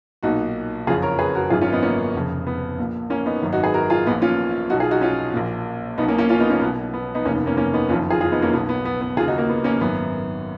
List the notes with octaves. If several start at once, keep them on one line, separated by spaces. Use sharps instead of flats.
B1 A#2 D#4 F#4
F#1 F2 C#3 F4 G#4
A#4 C#5
G#4 B4
F#4 A#4
G#1 F#2 D#3 F4 G#4
C#4 F4
B3 D#4
A#3 C#4
F1 F2 C#3
B3
A#1 A#2
A#3 C#4
B3 D#4
G#1 F#2 D#3
D#4 F#4
G#4 B4
F#4 A#4
F4 G#4
A#1 A#2 B3 D#4
C#4 F4
B1 B2 D#4 F#4
F4 G#4
D#4 F#4
C#4 F4
A#1 A#2
B1 B2 B3 D#4
A#3 C#4
A#3 C#4
C#4 F4
B3 D#4
A#3 C#4
B1 B2 B3
B3
B3 D#4
F1 D#2 D#3 A#3 C#4
B3
A#3 C#4
A#3 C#4
B3 D#4
F#1 F2 D#3 C#4 F4
F4 G#4
F4 G#4
B3 D#4
A#3 C#4
B1 B2 B3
B3
B3
B3
D#2 F4 G#4
C#3
D#4 F#4
A#3
B3
A#3 C#4
G#1 F#2 D#3 B3